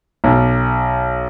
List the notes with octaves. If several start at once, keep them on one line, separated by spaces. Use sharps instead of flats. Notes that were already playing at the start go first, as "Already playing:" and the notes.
B1